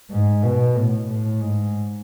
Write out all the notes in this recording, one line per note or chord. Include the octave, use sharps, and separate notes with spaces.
G#2
B2
A2
A2
G#2